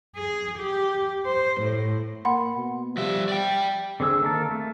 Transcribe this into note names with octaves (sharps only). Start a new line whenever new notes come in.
G#4
G4
C5
A2
A#3 F#5 B5 C6
B2
F3 G3 E5
D5 G5
D3 C4 G#4 E6
D#3 A#3 A4 A#4 A5
A3